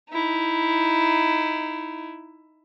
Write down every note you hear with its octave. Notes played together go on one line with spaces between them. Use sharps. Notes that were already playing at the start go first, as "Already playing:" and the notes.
D#4 E4